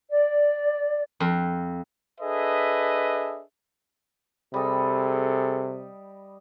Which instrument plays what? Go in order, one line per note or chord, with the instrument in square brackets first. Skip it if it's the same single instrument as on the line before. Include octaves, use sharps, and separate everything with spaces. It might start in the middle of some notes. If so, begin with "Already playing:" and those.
[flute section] D5
[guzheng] F2
[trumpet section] D4 G#4 A4 B4 D#5 E5
[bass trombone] C3 [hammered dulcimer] G3 D#5 [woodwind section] G#4 A4